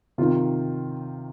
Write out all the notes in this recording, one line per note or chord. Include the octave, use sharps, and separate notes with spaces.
C3 D#3 F4